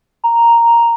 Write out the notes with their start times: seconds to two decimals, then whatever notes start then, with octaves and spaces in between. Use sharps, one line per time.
0.24 A#5